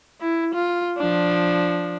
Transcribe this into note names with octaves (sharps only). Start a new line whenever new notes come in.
E4
F4
F3 D4